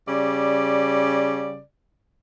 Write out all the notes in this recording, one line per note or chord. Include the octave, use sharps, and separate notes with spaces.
C#3 G3 D5